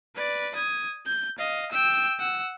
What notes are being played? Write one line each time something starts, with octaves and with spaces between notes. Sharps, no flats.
B4 D5
D#6 G#6
G6
D#5 F5
G5 E6
F#5 E6